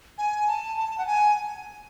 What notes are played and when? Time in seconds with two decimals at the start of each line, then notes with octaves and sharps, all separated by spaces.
0.18 G#5
0.48 A5
0.77 A5
0.98 F#5
1.07 G#5